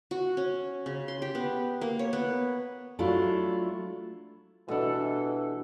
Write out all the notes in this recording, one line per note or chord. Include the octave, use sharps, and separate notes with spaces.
F#4
C#4
C#3
C6
G4
B3
A#3
C#5
B3
F#3 A3 D4 E4 F4
B2 E3 G3 D4 A4